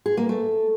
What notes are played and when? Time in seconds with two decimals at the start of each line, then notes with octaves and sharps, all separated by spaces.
0.06 G#4
0.17 A#3
0.29 A3